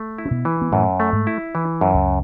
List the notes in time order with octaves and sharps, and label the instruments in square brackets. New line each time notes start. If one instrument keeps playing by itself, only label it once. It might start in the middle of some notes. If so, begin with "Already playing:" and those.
Already playing: [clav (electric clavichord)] A3
E4
[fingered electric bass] C#4
B2 B3
[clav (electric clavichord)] E3
[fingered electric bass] B3
[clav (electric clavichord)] F#2 [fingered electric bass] A2 A3
[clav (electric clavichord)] A3
[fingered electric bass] G#2 G#3
[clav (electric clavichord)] E4
E3
F#2
[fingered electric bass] C#2 C#3